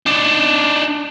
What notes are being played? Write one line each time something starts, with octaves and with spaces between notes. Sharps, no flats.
D4 D#4